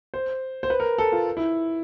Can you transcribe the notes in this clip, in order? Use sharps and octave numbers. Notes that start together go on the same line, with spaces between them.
C5
C5
B4
A#4
A4
F4
E4